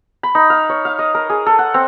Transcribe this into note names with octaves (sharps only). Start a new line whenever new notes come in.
B5
D#4
F5
C#5
F5
D#5
A#4
G#4
A4
F#5
C4